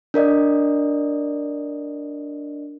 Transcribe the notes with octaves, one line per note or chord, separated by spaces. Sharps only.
D4 A#4 D5 D#5